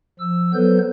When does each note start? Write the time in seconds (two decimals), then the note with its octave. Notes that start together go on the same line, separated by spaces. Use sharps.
0.19 F3 E6
0.53 F#3 B3 A4 B4 C5 G6